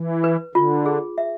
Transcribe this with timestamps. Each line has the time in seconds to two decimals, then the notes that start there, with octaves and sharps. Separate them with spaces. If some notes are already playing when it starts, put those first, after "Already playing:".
Already playing: E3
0.24 B4
0.55 D3 F4
0.86 G#4
1.18 E5